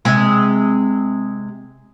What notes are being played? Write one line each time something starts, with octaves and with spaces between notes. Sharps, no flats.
C3 G#3